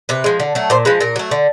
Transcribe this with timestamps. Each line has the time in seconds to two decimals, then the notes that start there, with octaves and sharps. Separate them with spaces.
0.09 C3 B4
0.24 F3 G#3
0.40 D3
0.55 F#3 A3
0.70 A#2 C5
0.85 F3 G#3 B4
1.01 A#2 A#4
1.16 F#3 A3
1.31 D3